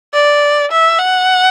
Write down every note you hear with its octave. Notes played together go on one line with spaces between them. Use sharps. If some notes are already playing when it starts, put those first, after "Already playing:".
D5
E5
F#5